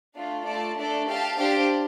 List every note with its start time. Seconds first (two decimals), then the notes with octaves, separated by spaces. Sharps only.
0.16 A3 D4 F4
0.45 A3 F4 D5 A5
0.77 A3 D4 A4 D5
1.07 G4 F5 A5
1.37 D4 G4 C5 F5